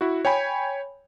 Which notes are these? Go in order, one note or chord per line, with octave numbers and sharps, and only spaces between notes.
E4 F#4
C#5 G5 G#5 B5